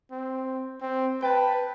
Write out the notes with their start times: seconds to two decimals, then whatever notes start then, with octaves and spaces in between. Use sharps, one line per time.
0.12 C4
0.81 C4
1.22 B4 G5 A5